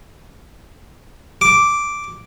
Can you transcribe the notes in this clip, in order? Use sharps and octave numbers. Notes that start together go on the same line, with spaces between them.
D6